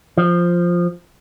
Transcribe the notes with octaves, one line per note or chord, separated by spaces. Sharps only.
F3